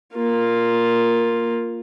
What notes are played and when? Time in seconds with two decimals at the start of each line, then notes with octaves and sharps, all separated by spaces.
0.15 A#3 F4